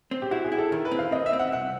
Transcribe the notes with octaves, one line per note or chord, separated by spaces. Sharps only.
C4
G4
E4 F#4
G#4
E4
A4
D#3 A#4
B4
C4
F5
C4 D#5
E5
C4
F#5
C2 F#5